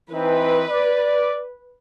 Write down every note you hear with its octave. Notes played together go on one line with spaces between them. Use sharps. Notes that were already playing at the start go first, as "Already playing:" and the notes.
E3 C4 D#4 B4
D5